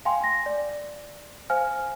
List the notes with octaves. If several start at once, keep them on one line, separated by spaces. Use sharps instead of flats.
F5 G5 G#5 C6
A#6
D5
C5 F5 G#5 F6